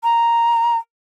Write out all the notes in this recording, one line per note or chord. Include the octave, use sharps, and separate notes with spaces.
A#5